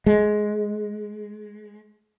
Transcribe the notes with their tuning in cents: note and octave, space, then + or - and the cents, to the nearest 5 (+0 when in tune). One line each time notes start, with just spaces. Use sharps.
G#3 +15